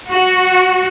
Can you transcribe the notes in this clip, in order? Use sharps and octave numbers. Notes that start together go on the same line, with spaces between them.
F#4